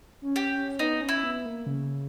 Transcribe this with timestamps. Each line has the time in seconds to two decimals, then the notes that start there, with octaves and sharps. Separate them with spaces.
0.22 C#4
0.36 G4
0.50 C#4
0.79 B3 D#4
1.01 C#4
1.09 E4
1.23 B3
1.45 A#3
1.66 C#3